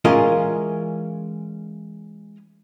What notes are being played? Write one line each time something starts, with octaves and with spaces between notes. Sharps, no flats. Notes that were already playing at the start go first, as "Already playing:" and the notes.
E3 G#3 C#4 F4 A#4 D#5